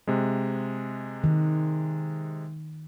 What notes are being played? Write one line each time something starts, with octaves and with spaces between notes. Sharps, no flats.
C3 G#3
D#3